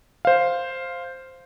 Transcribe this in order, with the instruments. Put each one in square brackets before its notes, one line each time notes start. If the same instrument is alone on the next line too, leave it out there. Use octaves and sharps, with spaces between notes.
[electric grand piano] C5 F5